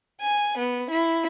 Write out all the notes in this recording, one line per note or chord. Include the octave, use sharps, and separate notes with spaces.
G#5
B3
E4